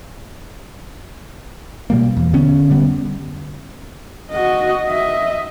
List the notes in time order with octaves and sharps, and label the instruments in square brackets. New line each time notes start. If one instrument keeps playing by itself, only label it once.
[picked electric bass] B2 G3 A#3
E2
D3 B3 C#4
F1 D3 G3 B3
[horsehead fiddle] F#4 D#5
D#5 E5